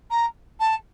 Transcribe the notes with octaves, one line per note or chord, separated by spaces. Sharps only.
A#5
A5